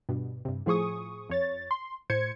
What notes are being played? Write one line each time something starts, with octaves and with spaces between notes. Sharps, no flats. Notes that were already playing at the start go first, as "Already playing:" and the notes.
G2 B2
G2 C3
A2 F3 G#4 C#6 D#6
F2 C#5 A6
C6
A2 C5 G#6 C#7